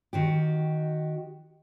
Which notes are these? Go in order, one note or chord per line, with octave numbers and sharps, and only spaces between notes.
D#3 F#4 G4